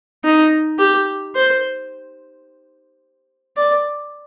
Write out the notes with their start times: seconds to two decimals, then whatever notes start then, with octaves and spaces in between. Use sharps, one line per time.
0.24 D#4
0.79 G4
1.35 C5
3.57 D5